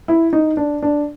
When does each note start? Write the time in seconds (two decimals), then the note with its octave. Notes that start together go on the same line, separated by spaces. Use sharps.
0.08 E4
0.33 D#4
0.57 D4
0.82 D4